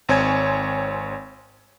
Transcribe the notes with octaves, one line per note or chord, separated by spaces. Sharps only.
G#1 C4 C#5 G#5 G#6